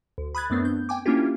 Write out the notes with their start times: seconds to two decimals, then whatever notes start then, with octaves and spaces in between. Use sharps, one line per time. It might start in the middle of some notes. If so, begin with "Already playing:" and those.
0.18 D2
0.35 B5 D#6 F#6 G#6 A6
0.50 F#2 A3 B3 C4 D4
0.65 G6
0.89 G5 G#5 D6
1.06 A#3 C#4 D4 E4 F4 G4